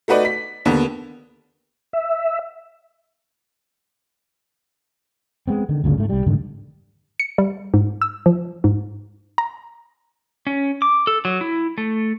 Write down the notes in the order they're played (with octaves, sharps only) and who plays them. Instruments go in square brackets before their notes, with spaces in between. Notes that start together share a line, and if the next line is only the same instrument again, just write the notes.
[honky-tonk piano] A3 D#4 F#4 B4 D5
B6
D#2 D3 B3
[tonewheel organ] E5
[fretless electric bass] G#3 B3 C4
D3 D#3
G1 D2 A#2 C#3
G#2 A3
C2 G3
F1 G#2 D3 D#3
[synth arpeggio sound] C#7
G3
G#2
E6
F3
G#2
A#5
[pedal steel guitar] C#4
D6
A4
F#3
E4
A3